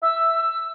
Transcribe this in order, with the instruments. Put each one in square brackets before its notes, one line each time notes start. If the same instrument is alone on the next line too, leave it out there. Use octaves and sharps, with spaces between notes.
[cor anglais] E5 [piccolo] E6